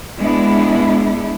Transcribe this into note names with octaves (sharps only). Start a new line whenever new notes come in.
G#3 B3 D4 E4